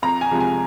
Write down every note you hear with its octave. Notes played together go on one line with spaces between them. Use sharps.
F2 A#5
G#5
C3 F3 G#3
G#5